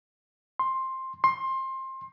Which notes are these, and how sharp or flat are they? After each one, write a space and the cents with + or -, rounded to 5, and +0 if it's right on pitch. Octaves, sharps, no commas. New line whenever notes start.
C6 +10
C6 +20